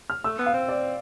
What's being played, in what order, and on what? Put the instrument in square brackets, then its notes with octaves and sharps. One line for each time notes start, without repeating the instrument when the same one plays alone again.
[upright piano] F6
[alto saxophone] A3 [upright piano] E6
[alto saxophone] B3
[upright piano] F5
[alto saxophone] C4
[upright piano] D5